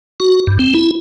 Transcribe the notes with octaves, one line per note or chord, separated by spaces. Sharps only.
F#4
G2
C4
E4